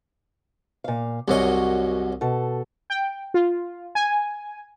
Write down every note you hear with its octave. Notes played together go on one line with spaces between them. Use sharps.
A#2 F5
C2 F#2 F#4 C#5 D#5
B2 A4
G5
F4
G#5